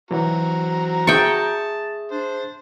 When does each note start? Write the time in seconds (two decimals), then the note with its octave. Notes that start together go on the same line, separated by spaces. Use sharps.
0.11 E3 F#3 C4 F#4 A#5
1.07 G#4 E5 G5 A5 C#6 D#6
2.12 D4 C5